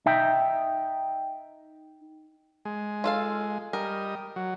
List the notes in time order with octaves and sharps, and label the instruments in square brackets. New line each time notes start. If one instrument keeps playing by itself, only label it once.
[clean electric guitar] D#4 E5 G5
[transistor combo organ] G#3
[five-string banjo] F4 A4 F5
[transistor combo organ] G3 D#5 [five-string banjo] A#4
[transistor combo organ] F#3